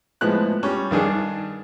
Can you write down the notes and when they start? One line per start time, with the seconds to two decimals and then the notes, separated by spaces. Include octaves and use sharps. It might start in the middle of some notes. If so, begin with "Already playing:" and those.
0.21 A2 F3 G#3 B3 F#6
0.63 G3 C#4
0.91 G2 D#3 D4 G#4